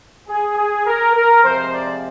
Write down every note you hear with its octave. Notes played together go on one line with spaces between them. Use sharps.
G#4
G#4
A#4
A#4
F2 C3 F3 G#3 C5
D5